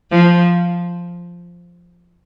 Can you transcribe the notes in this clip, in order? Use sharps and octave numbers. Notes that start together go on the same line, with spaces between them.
F3